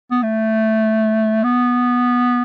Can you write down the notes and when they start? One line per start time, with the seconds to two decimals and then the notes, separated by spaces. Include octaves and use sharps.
0.11 B3
0.23 A3
1.44 B3